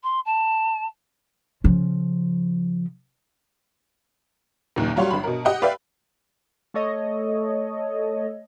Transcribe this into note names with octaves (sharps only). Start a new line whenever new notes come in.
C6
A5
C#3 F3
F#1 D#2 A#2
F#3 G3 F4 C#5 F#5 C6
G1 B5
B2 A#4
G4 D#5 F#5 G5
B4 D5 E5 F5 G5
A3 A4 C#5 D#5